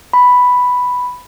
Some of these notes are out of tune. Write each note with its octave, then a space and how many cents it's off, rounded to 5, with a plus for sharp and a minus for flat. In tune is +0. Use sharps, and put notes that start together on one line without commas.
B5 +0